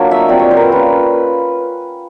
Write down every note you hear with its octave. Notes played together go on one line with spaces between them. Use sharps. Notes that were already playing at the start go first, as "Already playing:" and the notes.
Already playing: F#3 A#3 D4 F4 C#5
E5
D#5
G3 C4 F4 D5
C#5
C5
A#4 B4
A#3 C#4 F4 B4